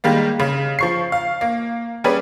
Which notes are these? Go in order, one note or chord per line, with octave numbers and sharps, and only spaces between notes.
D#3 G3 G#3 A#3
C#3
F3 C#6 C7
F5
A#3
G3 C#4 G#4 B4 D5